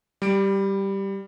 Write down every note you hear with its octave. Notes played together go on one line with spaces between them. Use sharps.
G3 D7